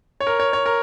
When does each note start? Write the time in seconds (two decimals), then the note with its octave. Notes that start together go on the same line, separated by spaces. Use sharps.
0.20 C#5
0.27 A#4
0.40 C#5
0.53 C#5
0.66 A#4